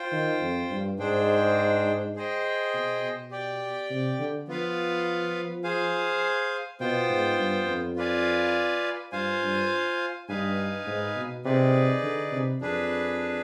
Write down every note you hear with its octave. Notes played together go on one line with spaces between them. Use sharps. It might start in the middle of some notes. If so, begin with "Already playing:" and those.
Already playing: F4 C5 G5
D#3
F2
G2
G#2 D4 G#4 C5 G5
G#4 C5 D#5 G5
B2
B2
G4 D5 G5
C3
D3
F3 B3 F4 B4 F5
G#4 C5 F5 G#5
B2 B3 F4 C5 G5
G#2
G2
F2
F4 B4 D5 F5 G#5
G2 F4 C5 F5 G#5
G2
G2 D#4 B4 F5 G#5
G#2
B2
C3 D#4 G#4 B4 D5
D3
C3
F2 D4 G#4 B4